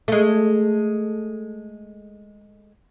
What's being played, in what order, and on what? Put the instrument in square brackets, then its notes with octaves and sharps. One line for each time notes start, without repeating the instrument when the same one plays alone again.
[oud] G#3 A3